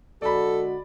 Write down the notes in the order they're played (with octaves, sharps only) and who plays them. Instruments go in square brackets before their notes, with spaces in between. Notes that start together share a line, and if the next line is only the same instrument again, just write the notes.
[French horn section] D3 G#3 F#4 [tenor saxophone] A4 [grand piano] D5 B5